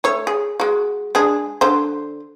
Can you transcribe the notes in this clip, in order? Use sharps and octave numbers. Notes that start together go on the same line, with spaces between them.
A3 C#5
G#4
G#3 F#4
G#3 D4 G#4
D3 C5